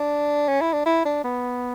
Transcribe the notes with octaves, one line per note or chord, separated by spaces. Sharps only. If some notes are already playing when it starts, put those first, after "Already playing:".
Already playing: D4
C#4
E4
D4
E4
D4
B3